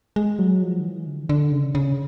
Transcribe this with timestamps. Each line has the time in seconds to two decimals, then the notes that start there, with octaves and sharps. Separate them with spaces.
0.16 G#3
0.39 F#3
0.62 F3
0.80 D#3
0.84 E3
1.07 D3
1.29 D3
1.52 C#3
1.75 C#3